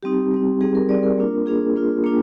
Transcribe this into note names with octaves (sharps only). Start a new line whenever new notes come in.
G3 C4 D#4 G4
G3 C4 D#4
G3 C4 D#4 G#4
A#4
G3 C4 D#4 D5
A#4
A#3 D4 F4
A#3 D4 F4 G#4
A#3 D4 F4
A#3 D4 F4